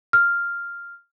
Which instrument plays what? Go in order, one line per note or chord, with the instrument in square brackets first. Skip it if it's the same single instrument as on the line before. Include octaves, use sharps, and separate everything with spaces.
[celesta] F6